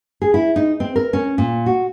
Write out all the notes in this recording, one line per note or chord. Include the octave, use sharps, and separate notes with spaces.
G#4
E4
D#4
C4
A#4
C#4
A#2
F#4